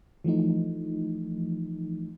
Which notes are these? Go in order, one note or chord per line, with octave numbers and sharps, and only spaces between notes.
E3 F3 A3 D#4